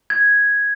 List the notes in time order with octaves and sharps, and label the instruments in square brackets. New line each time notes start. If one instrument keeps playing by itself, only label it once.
[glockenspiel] G#6